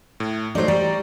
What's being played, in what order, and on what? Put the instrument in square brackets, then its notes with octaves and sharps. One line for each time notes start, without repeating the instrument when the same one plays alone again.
[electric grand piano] A2
[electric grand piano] F#3 A3 D#4 [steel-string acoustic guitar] C5 D5
[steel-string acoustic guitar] G3 [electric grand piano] D5 A#5 C#6